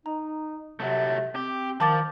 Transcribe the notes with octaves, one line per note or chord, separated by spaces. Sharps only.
D#4 A#5
C3 F#3 A3
C4 G4
D#3 F3 A5 D6 A6